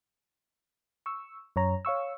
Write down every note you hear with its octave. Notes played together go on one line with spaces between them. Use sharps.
C#6 E6
F#2 C#5 A#5
C#5 F5 C#6 E6